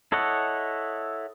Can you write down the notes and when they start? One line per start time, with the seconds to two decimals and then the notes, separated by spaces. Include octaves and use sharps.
0.12 E4 A4 C#5 D#5 F#5